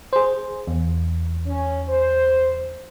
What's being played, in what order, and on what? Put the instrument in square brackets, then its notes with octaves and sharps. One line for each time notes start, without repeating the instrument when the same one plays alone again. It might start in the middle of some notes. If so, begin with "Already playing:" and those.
[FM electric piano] G#4 C5
E2
[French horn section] C#4
C5